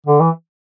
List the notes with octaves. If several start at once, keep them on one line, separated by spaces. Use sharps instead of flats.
D3
E3